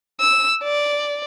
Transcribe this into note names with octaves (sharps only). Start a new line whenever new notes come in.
E6
D5